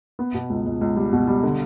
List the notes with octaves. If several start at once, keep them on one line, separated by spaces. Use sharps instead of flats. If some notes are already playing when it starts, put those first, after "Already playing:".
B3
B2
C#2
C#2
C#2
G3
B2
G3
D3